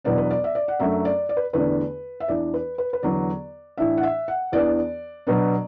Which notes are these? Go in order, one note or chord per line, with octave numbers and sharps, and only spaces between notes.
E2 B2 F#3 B3 D4 D5
B4
D5
E5
D5
F#5
F#2 F#3 A3 D4 E5
D5
D5
B4
E2 D3 A3 D4 B4
E5
E2 E3 D4 D5
B4
B4
B4
E2 D3 F#3 B3 D5
A2 E3 D4 E5
F#5
E5
F#5
E2 E3 B3 D4 D5
B2 F#3 B3 D4